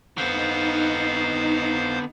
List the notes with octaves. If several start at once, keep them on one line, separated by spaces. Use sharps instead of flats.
F2 D3 B3 D#4 C5 F5